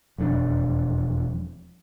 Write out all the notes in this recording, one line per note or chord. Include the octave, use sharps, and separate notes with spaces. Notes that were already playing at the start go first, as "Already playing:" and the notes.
E1 F2 F#3 D4